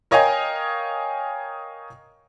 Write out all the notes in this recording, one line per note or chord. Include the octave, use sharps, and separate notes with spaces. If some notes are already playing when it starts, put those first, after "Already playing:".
A#4 C#5 D#5 F5 G5 G#5